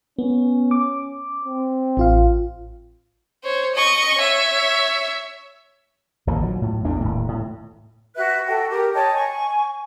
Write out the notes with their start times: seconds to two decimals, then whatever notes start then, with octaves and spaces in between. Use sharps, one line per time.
0.19 B3 C#4
0.71 D6
1.45 C4
1.97 A1 F4 F5
3.44 C5 C#5
3.75 D#5 C#6
4.18 C#5 E5
6.27 A1 D#2 A#2 F3
6.42 A#2 F#3
6.62 A2
6.84 A1 E2 A2 D4
7.00 D#1 A2
7.28 A2
8.15 F#4 B4 E5 F#6
8.47 F#4 A4 G5
8.69 G4 A#4
8.94 C#5 D#5 G5 A5
9.13 G#5 C#6